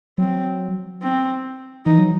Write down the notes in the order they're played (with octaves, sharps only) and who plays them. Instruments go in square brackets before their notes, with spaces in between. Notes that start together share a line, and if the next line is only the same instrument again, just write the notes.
[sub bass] F#3 [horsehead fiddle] C4
[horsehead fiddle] C4
[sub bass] E3 [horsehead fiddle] D#4
[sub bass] F#3